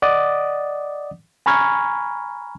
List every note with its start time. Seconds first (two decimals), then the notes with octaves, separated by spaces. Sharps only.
0.02 D5 D#5 F#5 D6 D#6 A6
1.46 G#5 A#5 B5 C#6 F6 G#6